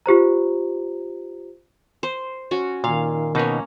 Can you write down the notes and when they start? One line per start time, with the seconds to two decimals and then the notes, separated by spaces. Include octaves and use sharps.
0.06 F4 G4 C5 A#5
2.03 C5
2.51 C#4 F#4
2.84 A#2 D#3 F5
3.35 B2 A#3 C#4 D#4 B4